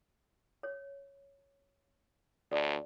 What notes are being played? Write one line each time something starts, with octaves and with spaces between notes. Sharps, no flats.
C#5
D2 D5